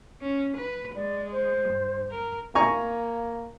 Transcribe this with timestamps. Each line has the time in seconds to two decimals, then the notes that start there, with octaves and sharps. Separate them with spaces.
0.21 C#4
0.58 B4
0.95 G#3 D5
1.32 C5
1.70 G2
2.11 A#4
2.55 A#3 G#5 A#5 C#6